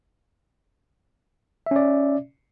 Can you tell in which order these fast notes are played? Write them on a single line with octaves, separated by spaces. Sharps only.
E5 C#4 D5